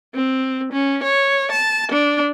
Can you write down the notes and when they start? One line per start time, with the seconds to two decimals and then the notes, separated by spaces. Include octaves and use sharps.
0.14 C4
0.72 C#4
1.04 C#5
1.52 A5
1.92 D4